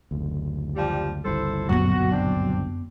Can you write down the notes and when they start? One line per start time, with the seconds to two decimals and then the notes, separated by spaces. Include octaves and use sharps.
0.11 F#1 D2
0.76 F3 G3
1.25 G1 C#2 G3 E4 A4 C5
1.69 F#2 A#2 F#3 B3 F#4
2.12 C4 D4